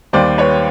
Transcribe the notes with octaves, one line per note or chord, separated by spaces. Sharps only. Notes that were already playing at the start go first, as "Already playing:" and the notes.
D#2 D#3 G3 C5 D5
B4 C#5